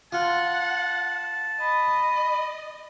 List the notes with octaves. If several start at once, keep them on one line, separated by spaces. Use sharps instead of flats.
F4 F#5 A5
D#5 B5